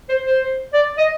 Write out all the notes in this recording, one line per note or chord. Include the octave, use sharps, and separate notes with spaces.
C5
C5
D5
D#5